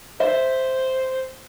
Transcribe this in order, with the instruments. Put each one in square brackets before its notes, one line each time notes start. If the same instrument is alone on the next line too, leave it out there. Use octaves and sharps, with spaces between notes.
[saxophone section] C5 [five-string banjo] E5